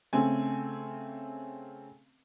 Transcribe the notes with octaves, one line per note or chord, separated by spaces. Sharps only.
C#3 A3 C4 G#5